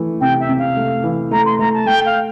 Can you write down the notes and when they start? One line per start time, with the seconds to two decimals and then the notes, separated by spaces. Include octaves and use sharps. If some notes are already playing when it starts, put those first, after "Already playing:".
Already playing: E3 A3
0.20 C3 G5
0.39 E5
0.49 C3
0.58 F5
0.77 A3
1.04 E3
1.31 A3 A#5
1.45 C6
1.59 A3 A#5
1.73 A5
1.86 A3 G5
2.05 F5